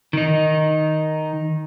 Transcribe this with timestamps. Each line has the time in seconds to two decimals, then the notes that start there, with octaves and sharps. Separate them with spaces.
0.13 D#3 D#4